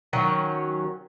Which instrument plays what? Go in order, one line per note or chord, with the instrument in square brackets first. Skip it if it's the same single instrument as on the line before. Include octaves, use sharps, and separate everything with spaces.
[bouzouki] D#3 F#3 C#4 C#5